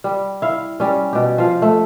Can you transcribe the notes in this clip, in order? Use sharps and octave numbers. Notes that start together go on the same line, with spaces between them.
G3
E4 F5
G3 C#4
B2 G4
F3 F5
A3